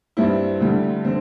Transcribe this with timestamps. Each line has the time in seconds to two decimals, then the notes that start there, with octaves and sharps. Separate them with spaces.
0.17 G2 G3 C4 E4
0.60 D2 D3 G3
1.05 D3 C4